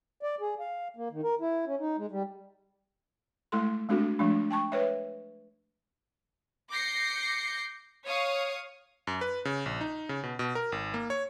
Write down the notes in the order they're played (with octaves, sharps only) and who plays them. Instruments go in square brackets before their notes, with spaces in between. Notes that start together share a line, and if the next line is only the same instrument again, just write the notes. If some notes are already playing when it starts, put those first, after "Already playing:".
[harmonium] D5
G#4
F5
A#3
D#3
A#4
E4
C#4
D#4
G#3
G3
[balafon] G#3 A3 E4 A4 C6
G#3 A3 C4 D4 F#4 A4
F3 G#3 A3 D4
G5 A5 C#6
B4 C#5 E5
[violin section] D6 G6 A#6 C7 C#7
C#5 F5 C#6 D#6
[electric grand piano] F#2
B4
C#3
A#1
D#4
C#3
B2
B2
A#4
G#1
A#3
C#5